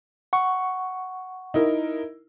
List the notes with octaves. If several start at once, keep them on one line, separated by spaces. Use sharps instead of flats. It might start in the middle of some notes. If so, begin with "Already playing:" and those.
F#5 C#6
D#4 E4 A#4